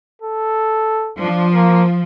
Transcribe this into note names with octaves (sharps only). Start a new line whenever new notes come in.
A4
F3 D4
A#3